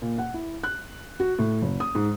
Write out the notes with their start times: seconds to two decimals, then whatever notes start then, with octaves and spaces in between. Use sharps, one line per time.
0.02 A#2
0.18 F#5
0.34 E4
0.63 F#6
1.20 F#4
1.39 A2
1.62 F#1
1.80 D#6
1.95 G#2